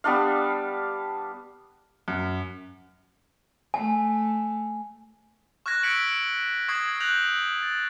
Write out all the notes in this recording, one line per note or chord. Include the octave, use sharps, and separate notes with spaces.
G3 B3 D4 F5
F#2
A3 G#5
C#6 F6 F#6 G#6 A#6
E6 G#6 B6 C#7 D7 F#7
C#6 D#6 G#6 C7
F#6 G6 A#6 F7 F#7
A6